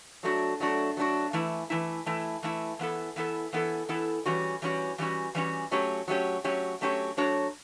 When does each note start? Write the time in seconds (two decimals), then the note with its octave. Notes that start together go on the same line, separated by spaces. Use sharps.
0.23 F#3 A3 D4 F#4
0.60 F#3 A3 D4 F#4
0.97 F#3 A3 D4 F#4
1.33 E3 A3 E4
1.70 E3 A3 E4
2.06 E3 A3 E4
2.43 E3 A3 E4
2.79 E3 B3 E4 A4
3.16 E3 B3 E4 A4
3.53 E3 B3 E4 A4
3.89 E3 B3 E4 A4
4.26 E3 G3 C#4 F#4
4.62 E3 G3 C#4 F#4
4.98 E3 G3 C#4 F#4
5.35 E3 G3 C#4 F#4
5.71 F#3 A3 C#4 G4 C#5
6.08 F#3 A3 C#4 G4 C#5
6.44 F#3 A3 C#4 G4 C#5
6.81 F#3 A3 C#4 G4 C#5
7.17 F#3 A3 D4 F#4 C#5